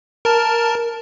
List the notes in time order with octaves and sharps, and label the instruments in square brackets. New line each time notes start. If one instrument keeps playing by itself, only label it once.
[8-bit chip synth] A#4 A5